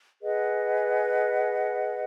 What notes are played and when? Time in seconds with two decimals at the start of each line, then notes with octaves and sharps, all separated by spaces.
0.21 G#4 B4 D#5 F#5